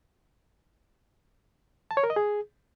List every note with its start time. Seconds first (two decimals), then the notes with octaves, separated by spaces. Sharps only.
1.91 A5
1.97 C#5
2.04 A#4
2.10 D#5
2.16 G#4